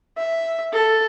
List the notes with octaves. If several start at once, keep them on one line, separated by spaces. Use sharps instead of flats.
E5
A4